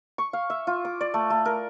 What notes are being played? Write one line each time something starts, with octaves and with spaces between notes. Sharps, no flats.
C#6
F5
E5
F4
D6
D5
A3
A3
A#4